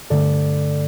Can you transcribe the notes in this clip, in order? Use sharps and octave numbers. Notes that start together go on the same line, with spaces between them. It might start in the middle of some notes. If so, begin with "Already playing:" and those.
G2 D3 A3 A4 D5